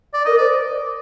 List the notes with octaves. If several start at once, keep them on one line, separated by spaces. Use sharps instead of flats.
D5
A#4 D#5
C5 D5